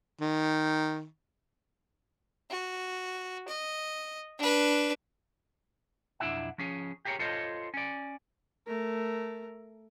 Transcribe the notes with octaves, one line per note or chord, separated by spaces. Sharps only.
D#3
F#4
D#5
D4 B4
B1 F2 D4 E4 E5 F#5
F3 C#4 G#4
G4 G#4 A#4 C#5
F4 A4 C5 C#5 D#5
C#4 D5
A3 A#4